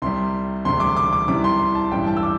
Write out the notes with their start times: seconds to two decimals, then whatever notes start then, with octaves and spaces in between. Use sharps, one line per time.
0.02 C2 C3 G3 C6
0.64 E1 D2 C3 G3 C6
0.80 D6
0.97 D6
1.13 D6
1.28 C2 C3 E3 G3 D6
1.44 C6
1.60 C6
1.75 A5
1.91 A1 G2 E3 G3 G5
2.07 A5
2.17 E6
2.23 D6